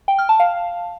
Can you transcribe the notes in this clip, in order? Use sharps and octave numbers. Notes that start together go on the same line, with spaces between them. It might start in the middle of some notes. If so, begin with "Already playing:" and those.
G5
F6
A5
F5